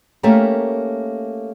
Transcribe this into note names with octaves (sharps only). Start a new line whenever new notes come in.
A3 A#3 C#4 G4 A#4